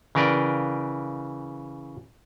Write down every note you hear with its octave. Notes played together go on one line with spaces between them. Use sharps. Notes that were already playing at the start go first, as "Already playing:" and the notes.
C#3 E3 A#4 B4 D5 G5